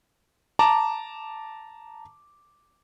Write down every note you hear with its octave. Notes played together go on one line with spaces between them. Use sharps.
A5 A#5 D6